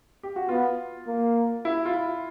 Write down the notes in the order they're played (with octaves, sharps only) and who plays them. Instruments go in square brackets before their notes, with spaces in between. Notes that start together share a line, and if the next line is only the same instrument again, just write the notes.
[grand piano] G4
F#4
[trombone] B3 [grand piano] F4
[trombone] A#3
[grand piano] E4
F4
E4